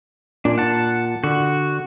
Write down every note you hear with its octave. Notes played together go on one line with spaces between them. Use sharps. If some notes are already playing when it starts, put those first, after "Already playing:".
A#2 D4
F#5 A5
D3 F#4